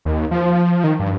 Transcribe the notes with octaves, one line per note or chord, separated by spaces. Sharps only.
D#2
F3
D#3
G2